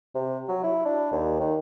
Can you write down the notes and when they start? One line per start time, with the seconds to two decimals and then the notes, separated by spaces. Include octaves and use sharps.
0.15 C3
0.48 F#3
0.63 E4
0.85 D4
1.12 D#2
1.40 D#3